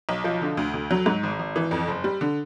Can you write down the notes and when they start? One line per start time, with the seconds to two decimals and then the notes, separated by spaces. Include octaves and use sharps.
0.09 B1
0.24 F3
0.42 D3
0.57 D2
0.74 D2
0.91 F#3
1.06 G#2
1.23 G#1
1.39 G#1
1.56 E3
1.71 F2
1.88 F#1
2.04 G3
2.21 D3